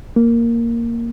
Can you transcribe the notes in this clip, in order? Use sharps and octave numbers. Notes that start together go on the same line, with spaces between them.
A#3